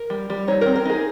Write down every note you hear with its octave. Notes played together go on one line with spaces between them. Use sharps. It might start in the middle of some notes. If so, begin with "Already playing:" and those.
Already playing: A#4
G3
G3
D#4 C#5
C4 A#4
A#4
D#4 G#4